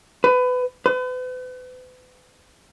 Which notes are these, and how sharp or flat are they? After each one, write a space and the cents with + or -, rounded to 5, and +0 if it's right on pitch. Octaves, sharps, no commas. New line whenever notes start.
B4 +25
B4 +40